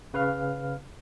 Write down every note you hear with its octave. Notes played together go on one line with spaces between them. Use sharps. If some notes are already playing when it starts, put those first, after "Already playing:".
C#3 B4 F5 F6